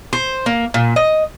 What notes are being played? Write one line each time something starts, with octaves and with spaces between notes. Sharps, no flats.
C5
A#3
A#2
D#5